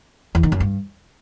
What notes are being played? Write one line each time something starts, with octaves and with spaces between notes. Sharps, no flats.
E2
D#3
F#2
G2